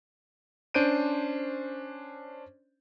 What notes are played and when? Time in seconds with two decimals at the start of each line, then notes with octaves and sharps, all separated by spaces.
0.74 C#4 D4 C5 G6 D7 D#7